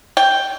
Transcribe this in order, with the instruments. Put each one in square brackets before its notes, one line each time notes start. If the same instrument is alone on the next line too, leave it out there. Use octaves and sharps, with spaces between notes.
[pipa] G5